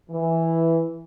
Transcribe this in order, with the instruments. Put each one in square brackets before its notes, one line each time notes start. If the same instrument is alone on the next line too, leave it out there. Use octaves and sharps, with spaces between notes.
[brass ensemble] E3